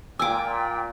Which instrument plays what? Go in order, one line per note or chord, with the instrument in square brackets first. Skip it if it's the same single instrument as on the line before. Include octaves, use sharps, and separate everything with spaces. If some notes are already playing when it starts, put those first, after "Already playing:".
[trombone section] A#2 [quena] G5 [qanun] G#5 D6 [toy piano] E6